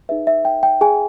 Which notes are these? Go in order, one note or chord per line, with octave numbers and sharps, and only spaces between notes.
D#4 G#4 B4 E5
E5
G5
G5
G#4 G#5